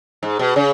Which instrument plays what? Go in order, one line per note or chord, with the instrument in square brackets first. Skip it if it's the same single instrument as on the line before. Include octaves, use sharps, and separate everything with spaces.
[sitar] G#2
B2
C#3